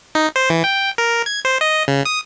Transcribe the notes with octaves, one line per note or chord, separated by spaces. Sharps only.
D#4
C5
E3
G5
A#4
G#6
C5
D#5
C#3
D#6